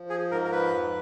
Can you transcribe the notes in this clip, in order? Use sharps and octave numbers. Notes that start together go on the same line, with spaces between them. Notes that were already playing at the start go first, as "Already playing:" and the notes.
Already playing: F3
G#4
G#2 A#4
A#4
B4
F2